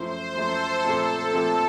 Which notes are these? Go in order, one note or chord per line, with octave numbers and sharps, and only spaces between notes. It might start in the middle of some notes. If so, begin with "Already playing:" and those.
Already playing: F#2 F3 A3 C5
F#2 F3 A3 A4
A#2 F3 A3 C4 F4 A4
A#2 F3 A3 C4 F4